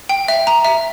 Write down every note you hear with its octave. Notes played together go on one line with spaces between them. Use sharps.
G5
E5
A#5
E5